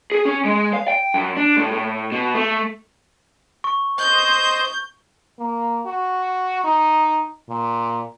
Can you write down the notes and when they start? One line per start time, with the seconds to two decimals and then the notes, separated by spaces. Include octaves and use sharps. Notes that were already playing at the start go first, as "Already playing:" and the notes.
0.12 G#4
0.25 C#4
0.45 G#3
0.73 F5
0.88 G5
1.14 F#2
1.37 D4
1.56 A2
1.72 A2
2.12 B2
2.35 A3
3.64 C#6
3.99 C5 D#5 G6
5.39 A#3
5.86 F#4
6.64 D#4
7.49 A#2